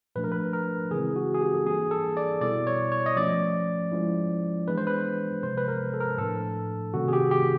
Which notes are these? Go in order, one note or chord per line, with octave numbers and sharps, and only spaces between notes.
A#2 F3 A3 D4 B4
A#4
B4
A#4
C#3 E3 G#3 C4 E4 G#4
F#4
G#4
G4
A4
E3 G3 A#3 D4 G#4
A4
D5
B2 G3 B3 E4 D5
C#5
C#5
D#5
F3 A3 C#4 D5
F3 G#3 C#4 E4
E3 G#3 B3 D4 B4
C5
B4
C3 F3 G#3 B3 C5
B4
A#4
A4
A#4
A4
A2 F3 A3 D4 A4
C3 D#3 G3 A#3 C#4 F#4
G#4
G4
G4